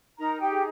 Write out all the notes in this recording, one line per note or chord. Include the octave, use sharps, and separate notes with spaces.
D#4 A#4 A#5
G4 G5
G#4